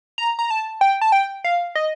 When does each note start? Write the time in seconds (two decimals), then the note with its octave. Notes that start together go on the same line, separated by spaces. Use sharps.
0.18 A#5
0.39 A#5
0.51 A5
0.81 G5
1.01 A5
1.12 G5
1.44 F5
1.75 D#5